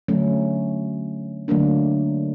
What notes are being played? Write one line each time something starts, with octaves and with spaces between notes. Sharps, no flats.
D3 F#3 A3 C#4
D3 F#3 A3 A#3 D4